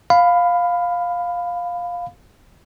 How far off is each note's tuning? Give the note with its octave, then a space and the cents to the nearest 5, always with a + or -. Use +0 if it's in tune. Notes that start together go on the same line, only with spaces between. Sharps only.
F5 +10 B5 +15